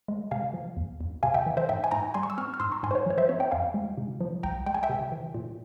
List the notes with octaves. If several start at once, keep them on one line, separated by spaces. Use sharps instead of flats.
G#3
C3 F5 G#5
F3
E2
E2
C3 F5 G#5
E5 G5
E3
C5 E5
G#2 E5 G5
G#5
G#2 G5 A#5
G3 G#5 C6
C#6
E6
C4 C#6 F6
F6
G#2 C6 E6
A#5 C#6
G#2 G#5 C6
C5
C#5
F3 C#5
C5 E5
C4 C#5
E5 G5
F2 F5 G#5
G#3
C3
F3
C2 G5 A#5
G#3 G5
G#5
E5 G5
C3
E3
A#2